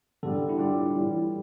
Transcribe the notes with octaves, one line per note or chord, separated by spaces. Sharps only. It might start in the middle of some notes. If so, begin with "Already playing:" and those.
D3 G3 D4 A4
E4
A2 G3 D4 F4 G4
A2 E3 G3